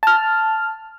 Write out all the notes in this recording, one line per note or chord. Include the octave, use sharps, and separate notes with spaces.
A5 F6